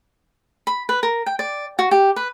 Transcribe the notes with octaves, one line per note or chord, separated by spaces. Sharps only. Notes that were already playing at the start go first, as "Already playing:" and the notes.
B5
B4
A#4
G5
D5
F#4
G4
B4